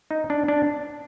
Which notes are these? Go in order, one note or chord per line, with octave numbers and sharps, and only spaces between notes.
D#4
D4
D4